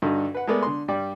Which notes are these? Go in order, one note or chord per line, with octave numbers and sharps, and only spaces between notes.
G2 D3 D#4 F#4 A4
B4 F#5
G#3 A3 B3 A#4 D5
D3 C6
G2 G3 D5